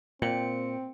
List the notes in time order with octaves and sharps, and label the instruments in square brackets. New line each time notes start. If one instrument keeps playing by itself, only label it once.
[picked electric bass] A#2 [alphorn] C4 [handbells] G5 C#7